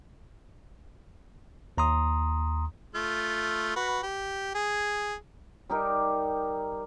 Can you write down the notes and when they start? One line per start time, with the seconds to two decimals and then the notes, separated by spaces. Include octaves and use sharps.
1.78 D#2 A#5 C6 D#6
2.95 A3 F4
3.76 F#4 B4
4.03 G4
4.55 G#4
5.70 G3 D#4 G4 A#4